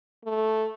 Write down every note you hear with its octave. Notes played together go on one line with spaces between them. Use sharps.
A3